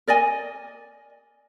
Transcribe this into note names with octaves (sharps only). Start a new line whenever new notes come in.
A#4 D5 D#5 G#5